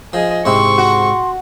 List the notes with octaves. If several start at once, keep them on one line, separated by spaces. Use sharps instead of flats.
F3 G#4 D#5
G#2 C3 E4 C6 C#6
F#4